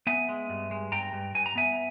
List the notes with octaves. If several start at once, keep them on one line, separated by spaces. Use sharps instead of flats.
B3 E5 G#5
G#3
G2
G#3
G2 G5 A#5
G2
G2 G#5
A#5
B3 E5 G#5